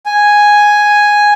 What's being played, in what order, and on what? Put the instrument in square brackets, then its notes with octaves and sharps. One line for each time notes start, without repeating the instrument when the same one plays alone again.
[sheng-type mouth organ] G#5